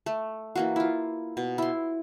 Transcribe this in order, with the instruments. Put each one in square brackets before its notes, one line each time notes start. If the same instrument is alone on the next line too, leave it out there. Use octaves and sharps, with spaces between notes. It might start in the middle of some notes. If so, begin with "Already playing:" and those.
[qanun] A3
E3 A#3 F#4
E4 F4
B2
E4 C6